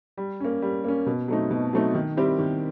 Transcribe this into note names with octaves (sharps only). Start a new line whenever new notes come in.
G3
A#3 C#4
G3
A#3 C#4
B2
F#3 A3 C4 D#4
B2
F#3 A3 C4 D#4
D#3
G3 C4 E4 G4
D#3